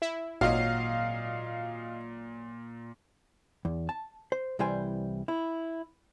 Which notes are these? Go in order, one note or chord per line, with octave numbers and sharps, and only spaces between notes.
E4
G#1 A#2 F#3 D#5 F5
E2
A5
C5
C2 E3 G3 C5 G#5
E4